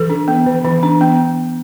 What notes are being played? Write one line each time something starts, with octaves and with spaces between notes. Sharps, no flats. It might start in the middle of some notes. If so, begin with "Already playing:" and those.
Already playing: E3 A4
D4
B3
E3
E3
D4
B3